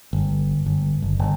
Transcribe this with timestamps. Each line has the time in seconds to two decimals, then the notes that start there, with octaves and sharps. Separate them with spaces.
0.13 G1
0.66 G1
1.02 F#1
1.19 G1